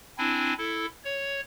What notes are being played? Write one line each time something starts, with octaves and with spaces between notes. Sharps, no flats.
C4 D4 E4 G#5
E4 A4
C#5